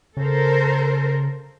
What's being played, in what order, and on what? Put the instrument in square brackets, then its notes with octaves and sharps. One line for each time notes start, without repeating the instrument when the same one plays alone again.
[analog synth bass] C#3 [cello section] A4 A#4 C5